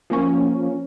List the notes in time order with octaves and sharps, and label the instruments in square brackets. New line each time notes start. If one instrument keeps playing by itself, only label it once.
[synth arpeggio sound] F3 A#3 C#4